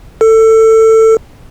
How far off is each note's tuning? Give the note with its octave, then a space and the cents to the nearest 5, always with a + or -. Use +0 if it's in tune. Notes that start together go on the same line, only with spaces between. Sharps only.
A4 +20